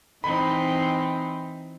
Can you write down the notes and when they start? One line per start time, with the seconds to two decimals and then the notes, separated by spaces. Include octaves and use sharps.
0.24 E3 C4 D#4 B5